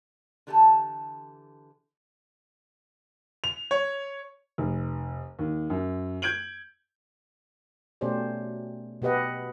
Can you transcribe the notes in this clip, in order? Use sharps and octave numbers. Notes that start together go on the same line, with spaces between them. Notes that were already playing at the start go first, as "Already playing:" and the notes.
D3 E3 G4 A4 A#4 A5
F7
C#5
F1
D#2
F#2
G6 G#6 D7 F#7
B2 A3 C#4 G4 C5 D5
B2 B3 G4 B4 D#5 F#5